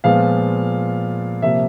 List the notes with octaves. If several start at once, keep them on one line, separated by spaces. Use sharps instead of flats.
A#2 F3 G#3 B3 F5
C3 F3 A#3 E5